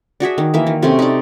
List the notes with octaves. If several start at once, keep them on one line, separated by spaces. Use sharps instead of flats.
D4 F#4 G#4 E5
D#3
E3 A#3 E5
D#3
C3 A3 C4 C#4
D#4 D5